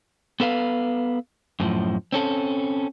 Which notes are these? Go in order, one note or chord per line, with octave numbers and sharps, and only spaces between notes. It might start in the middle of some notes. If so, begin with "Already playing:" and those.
B3 A4 B4 F5
F#2 A2 F3
C4 C#4 A4